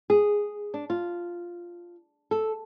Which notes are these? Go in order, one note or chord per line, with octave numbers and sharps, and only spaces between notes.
G#4
D4
F4
A4